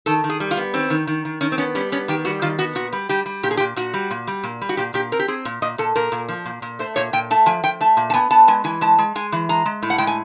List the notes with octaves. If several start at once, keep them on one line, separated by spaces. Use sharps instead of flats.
D#3 A4
D#3
G#4
G3
F4
B3
D#3 C4
D#3
D#3
D#3
D#3 C#4
C4
B3 C#4
G3 C#4
B3 C#4
D#3 G4
G3 F#4
D#3 F4
B3 F#4
A#2 F#4
G3
G3 G4
G3
A#2 G4
G#4
G4
A#2
A#2 F#4
G3
A#2
G3
A#2
G3
F#4
A#2 G4
A#2 G4
C4 A#4
G4
C4 G#4
A#2
A#2 D#5
A#2 A4
A#2 A#4
A#2
F3
A#2
A#2
A3 C5
A#2 C#5
A#2 G5
A3 A5
F3 G#5
F3 G5
A3 A5
A#2
A5
B3 G#5
B3 A5
G#3 G#5
E3 G#5
G#3 A5
G#3
G#3 G#5
E3
G#3 A#5
G#3
A2
F#5
G#3 G5
G#5